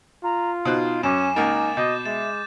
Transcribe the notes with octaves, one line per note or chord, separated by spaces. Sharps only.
F4 A#5
B2 D#4 C5 F#6
F#2 C#4 G#5 D6 E7
C#2 A#3 D#4 A6
B2 D#5 D6 G6
G#3 E5 A6 E7